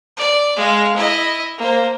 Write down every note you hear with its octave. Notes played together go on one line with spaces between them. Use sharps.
D5
G#3 F5
E4 D#5
A#3 C5